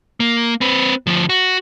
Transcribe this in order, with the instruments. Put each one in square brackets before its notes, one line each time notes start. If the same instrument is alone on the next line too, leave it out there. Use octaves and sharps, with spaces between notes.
[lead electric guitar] A#3
C4 B4
D2 F3
F#4